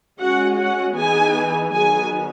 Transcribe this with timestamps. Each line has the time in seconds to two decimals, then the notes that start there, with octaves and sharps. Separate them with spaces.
0.19 G#3 C#4 F#4 F#5
0.57 F#4 F#5
0.96 E3 B3 D#4 G#4 G#5
1.72 D#3 F#3 B3 G#4 G#5